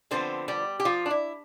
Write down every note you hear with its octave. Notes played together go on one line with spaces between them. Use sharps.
D3 F3 B3 C4 C5
G3 G4
G4
F3 F4
D4
E4